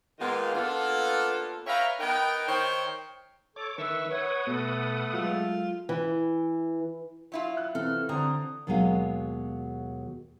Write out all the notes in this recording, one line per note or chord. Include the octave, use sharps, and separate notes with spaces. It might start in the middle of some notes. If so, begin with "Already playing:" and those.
G#2 D#3 A#3 B3 F4
A#3 B3 D4 F4 A4
B4 C#5 E5 F5 G5 A#5
B3 D#4 A#4 G5
D#3 C5 C#5 G5
A4 C#5 D6
D#3 B4 E5 C#6 E6
B4 C#5 F#5 D#6
B2 A3 B3 A4
F#3 G#3 F4
E3
F#3 E4 F4
F#6
C3 E3 A4 F6
D3 C4 A#5 D#6
D#2 B2 F#3 G#3 G#4 F5